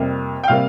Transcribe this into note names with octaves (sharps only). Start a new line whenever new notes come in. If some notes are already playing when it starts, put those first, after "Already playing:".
Already playing: F2 C3 G3 A#3
G5
C3 G3 A#3 F5